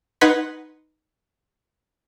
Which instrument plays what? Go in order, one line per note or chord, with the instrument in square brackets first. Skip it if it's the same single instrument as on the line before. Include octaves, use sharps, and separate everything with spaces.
[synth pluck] D#4 B4 F#5 C6 G#6 B6